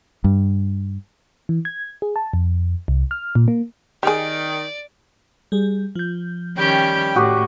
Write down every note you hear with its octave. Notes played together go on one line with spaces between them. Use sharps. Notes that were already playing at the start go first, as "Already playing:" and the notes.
G2
E3
G#6
G#4
A5
F2
C2
F6
A#2
A#3
D#3 G4 G#4 D5
G3 G#4
F3 G6
D#3 G3 C#4 G4 G5
A2 F#4 G4 D5 D#6